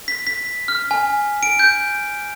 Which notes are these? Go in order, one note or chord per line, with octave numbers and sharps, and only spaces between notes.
B6
B6
F6
G#5
D7
G6